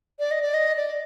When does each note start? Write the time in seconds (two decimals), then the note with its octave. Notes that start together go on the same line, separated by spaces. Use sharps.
0.19 D5
0.31 D#5
0.42 D5
0.54 D#5
0.76 D5